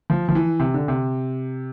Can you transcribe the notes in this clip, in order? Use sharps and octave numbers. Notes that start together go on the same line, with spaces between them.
F3
F3
E3
C3
D3
C3